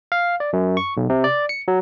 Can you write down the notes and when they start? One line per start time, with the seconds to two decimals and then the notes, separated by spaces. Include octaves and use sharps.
0.12 F5
0.40 D5
0.53 F#2
0.77 C#6
0.97 B1
1.09 C3
1.24 D5
1.49 C#7
1.68 F#3